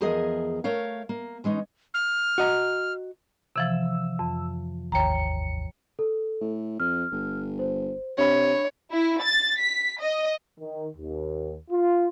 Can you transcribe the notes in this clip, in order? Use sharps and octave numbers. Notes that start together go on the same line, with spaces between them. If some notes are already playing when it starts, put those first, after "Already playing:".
E2 F3 G#4 A#4 D#5 E5
A3 A#4 C#5 F5
A#3
E3 G#3 C#4 D#4
F6
F#4 D#5 A#5
C3 E3 F3 E6
F2
G#1 D#2 C#5 G5 A#5 C#7
A4
A2
F2 F6
G1
C5
C3 D4 C#5 B5
E4
A6
B6
D#5
D#3
D#2
F4